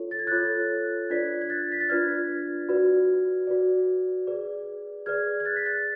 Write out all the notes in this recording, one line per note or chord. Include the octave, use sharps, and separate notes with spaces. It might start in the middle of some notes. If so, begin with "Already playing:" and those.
Already playing: F4 A4 C#5
A6
G#6
F4 A4 C#5 F#6 A6
D4 F4 B4 D5 G#6 B6
G#6
F#6 A6
B6
A6
D4 F4 B4 D5 F6 G#6
F#4 B4 D5
F#4 B4 D5
G#4 B4 D5
G#4 B4 D5 F6 G#6
G#6
F#6 A6
B6
F#6 A6